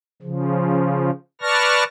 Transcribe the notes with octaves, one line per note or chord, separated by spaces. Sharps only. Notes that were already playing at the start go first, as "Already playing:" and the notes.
C#3 F3
B4 D5 A5 C#6 F6 A#6